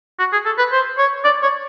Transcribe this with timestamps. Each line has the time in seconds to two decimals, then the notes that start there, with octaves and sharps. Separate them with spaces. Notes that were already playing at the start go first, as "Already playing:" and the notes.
0.19 F#4
0.33 G#4
0.46 A4
0.58 B4
0.72 C5
0.98 C#5
1.25 D5
1.43 C#5